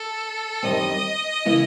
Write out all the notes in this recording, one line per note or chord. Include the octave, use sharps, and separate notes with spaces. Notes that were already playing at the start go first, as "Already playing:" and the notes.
Already playing: A4
F#2 D#3 G3 C4 D#5
C#3 E3 G#3 B3 E4